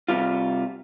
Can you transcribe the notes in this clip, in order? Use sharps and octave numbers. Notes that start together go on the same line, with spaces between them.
C3 G3 F4